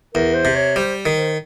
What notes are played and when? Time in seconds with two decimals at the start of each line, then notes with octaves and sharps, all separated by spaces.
0.15 E2 A#4
0.34 C5
0.45 C3
0.55 C#5
0.76 G3 C5
1.06 D#3
1.17 C5